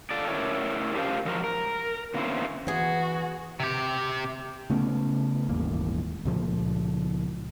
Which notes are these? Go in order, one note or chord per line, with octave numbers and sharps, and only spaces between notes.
F4 A4 D5
A2 C#4 E4 A#4 C#5 D5
D4 F4 G4 A#4 C5 F5
G#2 F3 F#3 A#4
A#4
D3 A#3 B3 C#4 E4 C5
E3 B3 F#4 G#4
C3 G4
C#3 A3 B3 C#4
D#1 G#1 E2 A#3
C#2 A#2 F3